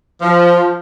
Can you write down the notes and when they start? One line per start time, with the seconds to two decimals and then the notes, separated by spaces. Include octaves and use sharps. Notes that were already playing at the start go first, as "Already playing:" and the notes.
0.20 F3